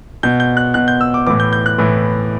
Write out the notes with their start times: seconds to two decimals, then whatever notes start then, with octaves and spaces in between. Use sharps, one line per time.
0.23 B2 G6
0.40 G6
0.57 F#6
0.74 B2 F#6
0.88 G6
1.01 E6
1.14 D6
1.27 A2 E3 D6
1.40 G6
1.53 G6
1.66 F#6
1.78 A2 E3